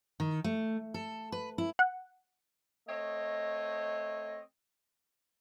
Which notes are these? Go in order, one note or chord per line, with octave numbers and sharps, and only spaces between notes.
D#3
A3
A4
B4
E4
F#5
A3 C4 C#5 D#5